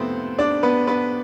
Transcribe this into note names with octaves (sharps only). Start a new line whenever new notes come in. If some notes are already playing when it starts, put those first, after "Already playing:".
Already playing: F2 C3 F3 A3 B3 C4 C5
D4 D5
B3 B4
B3 B4